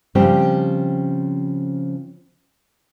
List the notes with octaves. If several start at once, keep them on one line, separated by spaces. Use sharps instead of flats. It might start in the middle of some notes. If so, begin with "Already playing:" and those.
C#3 F3 G3 C4 G4